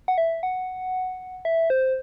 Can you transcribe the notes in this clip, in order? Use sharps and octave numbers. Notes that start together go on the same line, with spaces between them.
F#5
E5
F#5
E5
C5